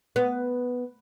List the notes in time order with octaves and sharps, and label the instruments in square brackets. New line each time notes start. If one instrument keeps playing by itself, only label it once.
[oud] B3